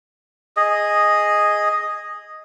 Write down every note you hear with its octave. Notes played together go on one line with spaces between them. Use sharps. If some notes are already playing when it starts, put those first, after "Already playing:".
G#4 D#5